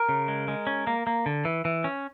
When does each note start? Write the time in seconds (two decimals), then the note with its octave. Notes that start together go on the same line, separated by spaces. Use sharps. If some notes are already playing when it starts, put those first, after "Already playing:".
Already playing: A#4
0.09 C#3
0.28 G#3
0.48 G#3
0.67 C#4
0.87 A#3
1.07 A#3
1.26 D3
1.45 E3
1.65 E3
1.84 C#4